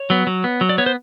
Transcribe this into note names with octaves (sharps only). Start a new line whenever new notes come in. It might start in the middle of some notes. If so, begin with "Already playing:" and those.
Already playing: C#5
F#3 B3
F#3
B3
F#3
D5
B3 C#5
C5